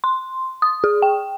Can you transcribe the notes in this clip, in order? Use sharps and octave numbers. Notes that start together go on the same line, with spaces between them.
C6
D#6
G#4
G5